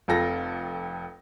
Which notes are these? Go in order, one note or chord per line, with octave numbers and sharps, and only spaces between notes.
F1 F2 F4 A4 A#6